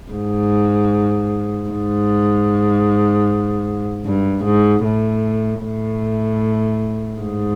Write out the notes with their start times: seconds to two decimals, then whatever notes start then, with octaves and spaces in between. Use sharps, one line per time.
0.12 G#2
1.70 G#2
4.05 G2
4.45 G#2
4.84 A2
5.62 A2
7.20 G#2